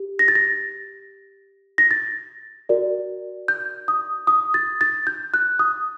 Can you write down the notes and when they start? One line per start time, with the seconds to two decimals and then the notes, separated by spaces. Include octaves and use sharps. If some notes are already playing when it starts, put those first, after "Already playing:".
Already playing: G4
0.19 A#6
0.28 A6
0.35 A#6
1.78 A#6
1.91 A6
2.69 F#4 A#4 D5
3.48 G6
3.88 D#6
4.27 D#6
4.54 A6
4.81 A6
5.07 G6
5.34 F#6
5.59 D#6